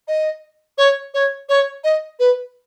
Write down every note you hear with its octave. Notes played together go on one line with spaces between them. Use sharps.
D#5
C#5
C#5
C#5
D#5
B4